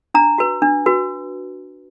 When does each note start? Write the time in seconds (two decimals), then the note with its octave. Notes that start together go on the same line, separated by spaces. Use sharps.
0.14 D4 A#5
0.38 F#4 B4
0.62 D4
0.86 F#4 B4